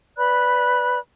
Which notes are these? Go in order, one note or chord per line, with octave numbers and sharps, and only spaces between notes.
B4 D5 B5 F#6